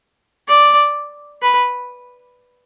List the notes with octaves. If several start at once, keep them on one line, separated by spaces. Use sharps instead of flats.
D5
B4